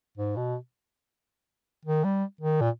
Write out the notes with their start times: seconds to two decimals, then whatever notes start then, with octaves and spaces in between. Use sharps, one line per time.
0.17 G#2
0.36 B2
1.85 D#3
2.04 G3
2.41 D#3
2.61 A#2